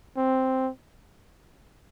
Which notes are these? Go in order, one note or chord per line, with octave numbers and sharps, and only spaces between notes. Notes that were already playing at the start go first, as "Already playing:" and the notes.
C4